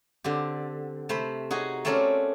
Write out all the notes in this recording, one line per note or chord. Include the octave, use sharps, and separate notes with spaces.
D3 C4 G4
C3 A3 C5 B5
D#4 F#4 G#4
A3 C4 C#4 A4 A#4 D5